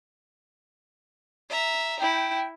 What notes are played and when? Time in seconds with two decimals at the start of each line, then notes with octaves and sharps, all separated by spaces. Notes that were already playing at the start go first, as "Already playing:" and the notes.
1.50 E5 A#5
2.00 E4 G5